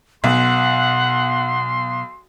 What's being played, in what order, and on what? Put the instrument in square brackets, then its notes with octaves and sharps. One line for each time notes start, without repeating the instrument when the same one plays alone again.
[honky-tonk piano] B1 [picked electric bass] B2 [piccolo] F#5 [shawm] C6